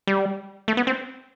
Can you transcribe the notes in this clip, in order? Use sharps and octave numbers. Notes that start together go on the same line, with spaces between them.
G3
A3
B3
C4